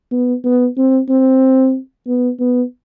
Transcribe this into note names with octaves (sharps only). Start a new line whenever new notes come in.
B3
B3
C4
C4
B3
B3